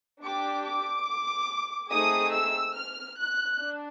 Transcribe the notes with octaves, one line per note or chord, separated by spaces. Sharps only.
D4 G4 D6
D6
A3 C4 D#4 G#4 D#6
E6
F6
F#6
D4